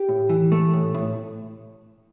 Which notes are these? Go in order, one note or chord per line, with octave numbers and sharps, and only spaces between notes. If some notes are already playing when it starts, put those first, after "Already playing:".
Already playing: G4
A2
E3
A3
A2
A2